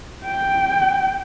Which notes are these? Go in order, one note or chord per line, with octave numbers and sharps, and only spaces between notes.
G5